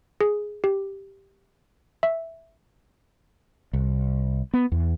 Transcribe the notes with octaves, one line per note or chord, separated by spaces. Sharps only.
G#4
G4
E5
C2
B3
E2